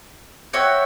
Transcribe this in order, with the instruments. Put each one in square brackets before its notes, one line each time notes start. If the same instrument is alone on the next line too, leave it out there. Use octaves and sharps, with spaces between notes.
[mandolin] F#4 C#5 E5 G5